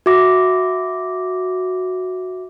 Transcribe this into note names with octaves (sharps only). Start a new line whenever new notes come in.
F#4 E5 D6 A#6